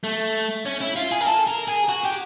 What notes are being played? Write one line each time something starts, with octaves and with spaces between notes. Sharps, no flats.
A3
C#4
E4
F4
G#4
A#4
A4
A#4
G#4
F#4
G4